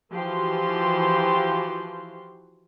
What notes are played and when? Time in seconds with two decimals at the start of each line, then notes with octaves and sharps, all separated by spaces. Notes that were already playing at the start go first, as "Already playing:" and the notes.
0.12 E3 F3 F#4 G4 C6